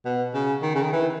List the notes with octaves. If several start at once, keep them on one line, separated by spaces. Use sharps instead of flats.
B2
C#3
D#3
C#3
D#3
E3